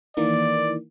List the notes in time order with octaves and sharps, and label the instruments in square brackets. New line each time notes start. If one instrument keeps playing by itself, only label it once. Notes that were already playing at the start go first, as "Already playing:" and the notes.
[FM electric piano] D#3 E3 A#3 [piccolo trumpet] D5